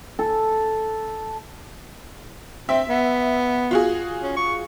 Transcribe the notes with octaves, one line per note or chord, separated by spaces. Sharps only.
A4
C4 E5
B3
F4 F#4 G#4
C#4
C#6